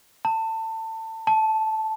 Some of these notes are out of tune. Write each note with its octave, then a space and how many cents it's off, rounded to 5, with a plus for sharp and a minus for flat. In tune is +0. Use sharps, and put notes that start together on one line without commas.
A5 +25
A5 -10